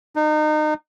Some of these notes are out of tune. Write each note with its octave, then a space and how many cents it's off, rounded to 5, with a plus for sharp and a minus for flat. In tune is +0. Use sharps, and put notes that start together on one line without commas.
D#4 -30